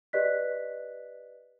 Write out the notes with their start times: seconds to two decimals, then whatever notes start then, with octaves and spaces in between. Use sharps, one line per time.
0.13 G4 B4 D5 D#5 F#6 B6